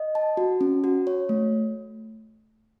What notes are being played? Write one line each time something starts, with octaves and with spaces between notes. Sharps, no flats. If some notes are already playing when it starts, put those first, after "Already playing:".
Already playing: D#5
A5
F#4
C#4
F#4
C#5
A3